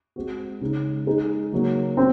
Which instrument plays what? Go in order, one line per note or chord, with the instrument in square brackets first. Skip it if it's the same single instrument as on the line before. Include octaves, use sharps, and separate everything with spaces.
[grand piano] G#3 C4 F#4
C#3 G#3 D#4
G#3 D#4 G#4
C#3 F#3 A#3 D#4
[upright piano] C4 [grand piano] F#4